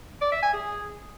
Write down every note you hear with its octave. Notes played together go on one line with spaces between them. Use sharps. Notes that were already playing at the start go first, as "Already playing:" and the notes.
D5
E5
G#5
G#4